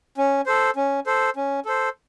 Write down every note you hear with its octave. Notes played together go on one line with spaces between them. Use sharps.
C#4
A4 C5
C#4
A4 C5
C#4
A4 C5